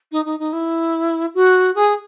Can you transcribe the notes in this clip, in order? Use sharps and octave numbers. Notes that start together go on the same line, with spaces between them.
D#4
D#4
D#4
E4
F#4
G#4